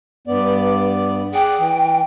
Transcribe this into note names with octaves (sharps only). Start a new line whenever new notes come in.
G2 B3 D5
G#4 D5 F#5 G5
E3